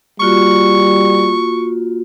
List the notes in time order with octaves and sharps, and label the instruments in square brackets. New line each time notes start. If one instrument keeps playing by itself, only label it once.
[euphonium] G3 [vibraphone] A#3 F4 F#4 [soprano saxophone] C#6